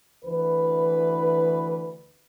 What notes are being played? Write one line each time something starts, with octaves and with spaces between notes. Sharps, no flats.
D2 E3 B4